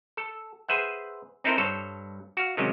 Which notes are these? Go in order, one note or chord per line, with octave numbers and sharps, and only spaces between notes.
A4
G#4 B4 C5 E5 F#5
C4 D#4 E4 A4 A#4 C5
G2 A4 C5 C#5
F#4 F5
C3 D#3 F#3 G#3 C#4